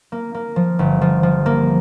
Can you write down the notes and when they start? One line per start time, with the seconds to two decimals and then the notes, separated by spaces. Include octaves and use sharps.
0.12 A#3
0.34 A#3
0.56 F3
0.79 G1
1.01 F3
1.23 F3
1.46 A#3